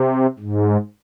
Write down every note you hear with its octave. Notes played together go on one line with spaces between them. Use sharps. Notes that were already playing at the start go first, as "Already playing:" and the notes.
Already playing: C3
G#2